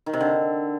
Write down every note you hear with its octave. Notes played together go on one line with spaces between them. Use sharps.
D#3
C3
D3